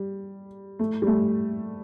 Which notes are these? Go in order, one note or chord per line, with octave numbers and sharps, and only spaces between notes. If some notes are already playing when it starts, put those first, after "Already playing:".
Already playing: G3
A3
G3
A3